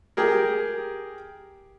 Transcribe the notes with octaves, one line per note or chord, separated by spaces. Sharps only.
G4 G#4 A#4